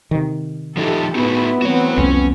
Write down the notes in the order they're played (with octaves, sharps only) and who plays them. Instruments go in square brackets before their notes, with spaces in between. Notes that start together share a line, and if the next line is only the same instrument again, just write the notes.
[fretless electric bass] C3 D#3
[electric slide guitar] F3 D#4 E4 [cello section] G4 A4
[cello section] A2 E4 [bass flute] B3 [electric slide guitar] D#4 F#4 G#4
[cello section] E3 A3 C4 [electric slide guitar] F#4 C#5
[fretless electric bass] C2 F2 [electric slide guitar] C#4